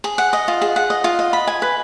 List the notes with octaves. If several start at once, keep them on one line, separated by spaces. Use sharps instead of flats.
G#4
F#5
D#5
F4
G#4
F#5
D#5
F4
D#5
B5
G#5
B4